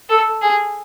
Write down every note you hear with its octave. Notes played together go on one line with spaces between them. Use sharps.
A4
G#4